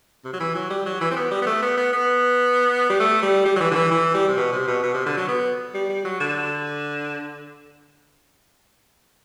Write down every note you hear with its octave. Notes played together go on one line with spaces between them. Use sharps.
C3
F#3
E3
F#3
G3
F#3
E3
C4
B3
G3
B3
A3
B3
B3
B3
G3
A3
G3
G3
F#3
E3
D3
E3
E3
G3
C3
B2
C3
B2
B2
C3
D3
F#3
B3
G3
G3
F#3
D3